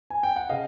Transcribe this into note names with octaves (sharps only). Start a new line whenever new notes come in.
G#5
G5
F#5
C#3 D#5 F5